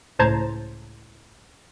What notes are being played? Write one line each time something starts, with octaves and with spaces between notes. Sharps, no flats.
C#2 A2 C5 A5 A#5 G#6